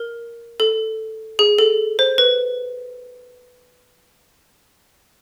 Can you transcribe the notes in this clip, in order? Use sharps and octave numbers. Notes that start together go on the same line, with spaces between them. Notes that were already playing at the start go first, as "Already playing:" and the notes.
Already playing: A#4
A4
G#4
A4
C5
B4